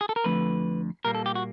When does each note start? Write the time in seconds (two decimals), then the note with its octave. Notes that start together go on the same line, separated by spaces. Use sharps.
0.01 G#4
0.09 A4
0.16 A#4
0.24 F2 D3 F3 A3 B4
1.05 A#2 G3 A#3 A#4
1.15 A4
1.26 G4
1.35 F#4